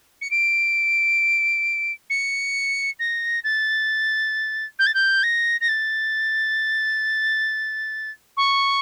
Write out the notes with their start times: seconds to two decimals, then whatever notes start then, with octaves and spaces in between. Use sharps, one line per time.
0.21 C#7
0.31 D7
2.10 C#7
2.99 A#6
3.44 A6
4.79 G6
4.86 A6
4.94 G6
5.23 A#6
5.61 A#6
5.68 A6
8.37 C#6